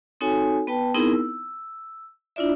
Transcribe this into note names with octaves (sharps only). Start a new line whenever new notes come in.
C4 D#4 F#4 A4 C#5 G#5
B3 B4 G5 A5
B3 C4 D#4 E4 G#4 A#4
E6
D4 E4 F4 D5 E5